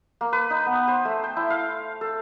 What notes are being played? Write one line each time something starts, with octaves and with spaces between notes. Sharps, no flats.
A#3
B4
D#4
B3
C5
A3
G5
E4
F5
A4